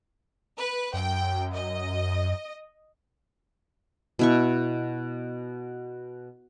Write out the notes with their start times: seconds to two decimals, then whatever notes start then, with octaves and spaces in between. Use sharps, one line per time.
0.58 B4
0.94 F#2 G5
1.54 D#5
4.19 B2 E4 C#6